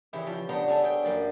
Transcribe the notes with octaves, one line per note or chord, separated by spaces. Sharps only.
C#3 E3 E4 G4 E5
F3
C#3 B3 D4 G5 A#5
C#4 D4 A4 E5
G#4 G5
F#2 A#3 D5 G5